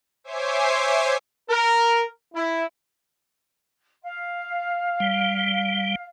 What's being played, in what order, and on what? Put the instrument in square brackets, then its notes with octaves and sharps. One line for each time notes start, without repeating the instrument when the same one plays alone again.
[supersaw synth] C5 C#5 E5 G#5 D6 C7
[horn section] A#4
E4
[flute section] F5
[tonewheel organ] G3